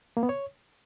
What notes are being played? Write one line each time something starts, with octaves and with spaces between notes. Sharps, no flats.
A#3
B3
C#5